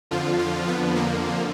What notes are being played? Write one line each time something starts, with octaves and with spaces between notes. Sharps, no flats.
F2 D3 F3 F4
F4
B3
A#3